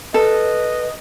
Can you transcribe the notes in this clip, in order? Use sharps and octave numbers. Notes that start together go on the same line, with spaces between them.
A4 B4 D#5